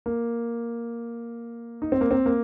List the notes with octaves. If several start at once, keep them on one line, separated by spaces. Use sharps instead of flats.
A#3
D#4
C4
A#3
C4
A#3